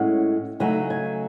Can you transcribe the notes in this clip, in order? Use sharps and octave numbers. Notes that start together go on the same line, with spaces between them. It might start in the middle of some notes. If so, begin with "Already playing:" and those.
Already playing: A2 G#3 C#4 F#5
C#3 F#3 A3 D#4 G#5
G#5